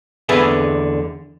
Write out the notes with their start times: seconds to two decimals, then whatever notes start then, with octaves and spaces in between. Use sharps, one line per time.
0.29 E2 D3 G#4 B4 E5